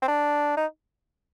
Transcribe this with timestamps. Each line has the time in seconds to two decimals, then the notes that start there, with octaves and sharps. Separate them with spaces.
0.02 C4
0.08 D4
0.57 D#4